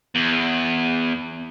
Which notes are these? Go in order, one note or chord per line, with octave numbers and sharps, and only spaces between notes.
E2